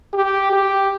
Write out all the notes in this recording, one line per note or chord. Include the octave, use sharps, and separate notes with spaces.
G4
G4